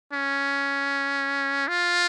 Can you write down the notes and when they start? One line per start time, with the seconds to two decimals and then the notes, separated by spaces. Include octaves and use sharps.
0.13 C#4
1.68 F4